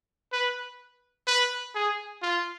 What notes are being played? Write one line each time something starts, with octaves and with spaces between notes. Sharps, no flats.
B4
B4
G#4
F4